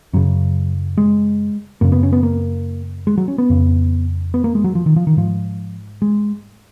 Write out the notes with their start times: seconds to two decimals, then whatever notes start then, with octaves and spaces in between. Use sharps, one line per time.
0.13 F#2 C#3 F#3
0.98 G#3
1.81 F#2 C#3 A#3
1.92 B3
2.03 C#4
2.13 B3
2.23 A#3
3.07 G#3
3.18 F#3
3.28 C#4
3.38 B3
3.50 F2 C#3
4.34 B3
4.44 A#3
4.55 G#3
4.64 F#3
4.75 F3
4.86 D#3
4.96 F3
5.07 D#3
5.17 G#2 F3
6.02 G#3